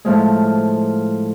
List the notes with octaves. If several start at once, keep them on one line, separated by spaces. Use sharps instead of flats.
A2 F3 G#3